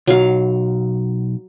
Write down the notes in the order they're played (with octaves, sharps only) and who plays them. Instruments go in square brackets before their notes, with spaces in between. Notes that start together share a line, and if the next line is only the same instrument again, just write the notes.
[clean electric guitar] B1 [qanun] F#3 F5